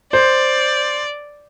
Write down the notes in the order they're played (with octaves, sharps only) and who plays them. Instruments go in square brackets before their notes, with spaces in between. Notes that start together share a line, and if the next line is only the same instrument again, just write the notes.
[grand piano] C5 [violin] D5